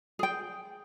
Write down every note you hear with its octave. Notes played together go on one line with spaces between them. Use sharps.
G#4 G5